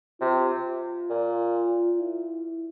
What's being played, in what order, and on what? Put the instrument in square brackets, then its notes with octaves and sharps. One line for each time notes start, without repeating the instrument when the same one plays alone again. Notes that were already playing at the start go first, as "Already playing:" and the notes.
[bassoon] C3 [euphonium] F4
[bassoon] A#2
[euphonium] E4